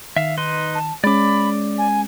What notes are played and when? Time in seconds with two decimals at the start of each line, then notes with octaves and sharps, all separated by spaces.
0.17 D#3 E5 F5
0.38 D#4 B4 C6
0.74 A5
1.04 G#3 C#4 D5 B5 D6
1.78 G#5